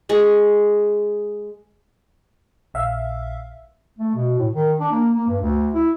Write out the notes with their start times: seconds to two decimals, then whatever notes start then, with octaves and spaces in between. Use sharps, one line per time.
0.09 G#3 G#4 C#6
2.74 A#1 E5 F5
3.99 A3
4.15 B2
4.38 A2
4.55 D#3
4.80 D4
4.92 A#3
5.14 A#3
5.28 G2
5.42 D2
5.75 E4